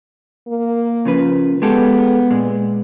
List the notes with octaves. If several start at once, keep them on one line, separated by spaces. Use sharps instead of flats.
A#3
C#3 F3 B4
G#3 B3 G4 A4
A#2 G#3